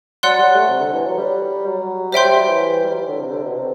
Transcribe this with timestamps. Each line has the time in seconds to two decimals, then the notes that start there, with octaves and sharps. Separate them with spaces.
0.23 F#3 D5 F#5 C6 F#6
0.39 G3
0.55 A3
0.68 C3
0.81 D3
0.93 E3
1.05 F#3
1.18 G3
1.66 F#3
2.12 G3 C5 E5 G5 C6 G6
2.25 G3
2.37 F#3
2.48 E3
2.83 G3
2.92 F#3
3.00 E3
3.08 D3
3.20 C3
3.32 D3
3.43 B2
3.56 C3